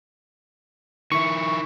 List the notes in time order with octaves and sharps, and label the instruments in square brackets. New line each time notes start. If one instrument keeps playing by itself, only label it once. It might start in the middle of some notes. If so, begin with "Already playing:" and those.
[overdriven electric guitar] D#3 E4 [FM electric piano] C#6